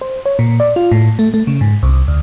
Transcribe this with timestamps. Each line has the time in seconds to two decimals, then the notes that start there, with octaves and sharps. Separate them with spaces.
0.01 C5
0.26 C#5
0.39 A#2
0.60 D5
0.76 F4
0.91 A2
1.19 A3
1.34 A3
1.47 C#3
1.61 G#2
1.83 C2
2.08 D2